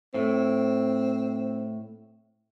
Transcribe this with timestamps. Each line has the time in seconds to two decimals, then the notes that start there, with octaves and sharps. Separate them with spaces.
0.14 A2 C4